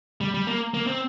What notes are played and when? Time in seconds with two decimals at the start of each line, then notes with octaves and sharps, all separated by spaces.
0.21 G3
0.34 G3
0.47 A#3
0.74 A#3
0.87 C4